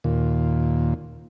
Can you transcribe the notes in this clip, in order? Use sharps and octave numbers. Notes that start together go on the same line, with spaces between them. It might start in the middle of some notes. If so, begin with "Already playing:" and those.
D#2 A#2